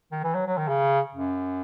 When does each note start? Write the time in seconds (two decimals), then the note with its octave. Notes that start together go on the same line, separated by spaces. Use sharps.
0.12 D#3
0.24 E3
0.35 F#3
0.47 F#3
0.58 D#3
0.68 C#3
1.15 F#2